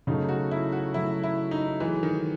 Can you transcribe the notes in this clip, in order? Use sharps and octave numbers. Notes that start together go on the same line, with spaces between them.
C#3 F#3 A3 D#4
F#4
E4
F#4
C#3 F#3 A3 E4
E4
D#4
E3 F#3 A3 E4 G#4
D#3